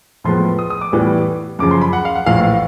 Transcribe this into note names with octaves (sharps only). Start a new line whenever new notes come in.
A2 F3 G#3 B3 C6
D#6
D#6
D6
A2 E3 G3 B3
F#2 C#3 F3 D6
C6
B5
F#5
F5
F#5
A#1 A2 E3 F5
F5